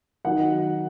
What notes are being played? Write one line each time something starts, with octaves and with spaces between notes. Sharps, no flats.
D#3 F#3 D#4 F#5